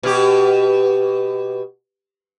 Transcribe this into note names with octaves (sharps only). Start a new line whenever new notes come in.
B2 G4